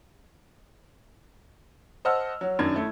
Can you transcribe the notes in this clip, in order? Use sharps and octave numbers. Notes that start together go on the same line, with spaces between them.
C5 D#5 F#5 A5 E6 F6
F#3
F#2 D#3 D4 G#6
A3 E4